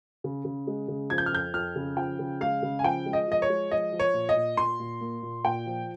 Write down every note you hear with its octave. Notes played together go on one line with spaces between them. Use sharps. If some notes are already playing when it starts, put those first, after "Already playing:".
C#3
C#3
G#3
C#3
F3 G#6
G6
F6
F2 G6
F2 F6
C#3
F3 G5
C#3
G#3 F5
C#3
G#5
F3 G5
G#3
D#5
F3 D#5
C#5
G#3
F3 D#5
F3
C#5
A#2
D#5
A#2
A#2 C6
A#2
A#3
A#2
A#2 G5
F3